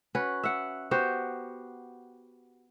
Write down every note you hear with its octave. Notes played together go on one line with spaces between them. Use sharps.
C#4 F#4 B4
E5 F#5
B3 F#4 G4 C5